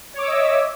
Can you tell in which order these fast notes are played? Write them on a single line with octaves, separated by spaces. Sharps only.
C#5 D6 E6 D#5 E5